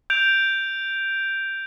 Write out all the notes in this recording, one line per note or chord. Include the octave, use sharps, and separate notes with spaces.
G6 D7 F7